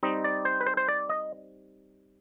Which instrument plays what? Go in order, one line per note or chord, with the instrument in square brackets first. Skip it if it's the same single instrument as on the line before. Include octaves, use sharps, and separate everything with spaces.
[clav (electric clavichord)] G3 C4 D#4 D#5
D5
C5
B4
C5
C5
D5
D#5